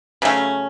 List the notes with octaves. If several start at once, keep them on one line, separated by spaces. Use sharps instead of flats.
C#3 F#3 A3 C#4